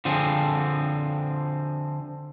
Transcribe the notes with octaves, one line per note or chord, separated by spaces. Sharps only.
D3 F3 C4 G#4